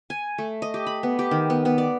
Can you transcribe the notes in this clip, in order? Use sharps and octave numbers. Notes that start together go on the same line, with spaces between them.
G#5
A3
D#5
G4
B5
B3
G4
D#3
B3
B3
D5